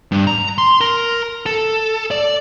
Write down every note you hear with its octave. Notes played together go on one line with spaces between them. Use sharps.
G2
A#5
C6
A#4
A4
D5